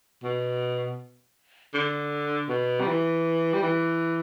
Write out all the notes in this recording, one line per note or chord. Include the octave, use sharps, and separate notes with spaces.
B2
D3
B2
G3
E3
G3
E3